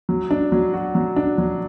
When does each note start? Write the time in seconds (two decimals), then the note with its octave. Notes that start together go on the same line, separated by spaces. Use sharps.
0.09 F#3
0.31 D4
0.52 F#3
0.73 F#4
0.95 F#3
1.16 D4
1.38 F#3